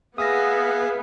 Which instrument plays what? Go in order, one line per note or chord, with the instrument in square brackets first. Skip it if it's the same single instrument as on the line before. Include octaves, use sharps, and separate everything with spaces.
[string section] B3 [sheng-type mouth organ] G#4 E5 F5 [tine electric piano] D#6 A#6